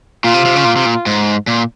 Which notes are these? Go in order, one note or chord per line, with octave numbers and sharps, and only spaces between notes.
A#2 F4
C3
C3
C#3
A#2
C3
A#2
G#2
A#2